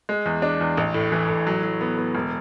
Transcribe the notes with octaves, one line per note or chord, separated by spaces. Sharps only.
G#3
E2
D4
E2
A1
A2
E3
A2
F#3
F#3
B3
B3
E1